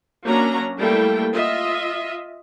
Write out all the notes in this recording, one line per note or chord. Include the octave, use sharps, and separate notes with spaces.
F#3 A#3 C#4 D4 A#5
G3 A3 A#3 E4 A4 G5
F4 D#5 E5